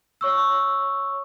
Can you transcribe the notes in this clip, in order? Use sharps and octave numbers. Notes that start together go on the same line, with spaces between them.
C#5 C#6 E6